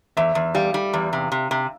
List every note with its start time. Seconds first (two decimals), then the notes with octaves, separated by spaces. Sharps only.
0.17 E2 E5
0.35 E2
0.55 G3 F5
0.74 G3
0.94 E2
1.13 C3
1.32 C3
1.51 C3